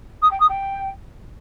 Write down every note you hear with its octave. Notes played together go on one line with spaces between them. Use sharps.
D#6
G5
D#6
G5